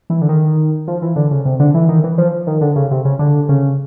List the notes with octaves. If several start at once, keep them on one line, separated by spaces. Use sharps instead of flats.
E3
D3
D#3
F3
E3
D3
C#3
C3
D3
E3
D#3
E3
F3
D#3
D3
C#3
C3
C#3
D3
C#3